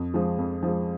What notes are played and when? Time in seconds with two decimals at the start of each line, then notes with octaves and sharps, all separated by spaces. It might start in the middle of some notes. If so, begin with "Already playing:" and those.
Already playing: F2
0.14 F3 G#3
0.38 F2
0.63 F3 G#3